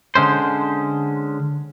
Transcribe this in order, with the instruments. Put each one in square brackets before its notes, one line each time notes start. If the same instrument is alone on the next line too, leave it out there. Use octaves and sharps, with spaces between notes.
[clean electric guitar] D3 G#3 C#4 C5